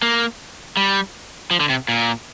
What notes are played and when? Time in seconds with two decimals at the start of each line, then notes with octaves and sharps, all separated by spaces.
0.02 A#3
0.77 G3
1.51 F3
1.60 D3
1.70 C3
1.88 A#2